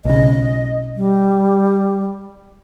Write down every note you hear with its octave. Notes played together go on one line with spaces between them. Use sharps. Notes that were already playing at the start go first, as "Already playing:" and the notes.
B1 C#3 D#5
G3